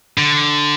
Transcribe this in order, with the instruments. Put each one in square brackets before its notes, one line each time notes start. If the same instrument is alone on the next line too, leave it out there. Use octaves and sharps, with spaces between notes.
[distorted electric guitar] D3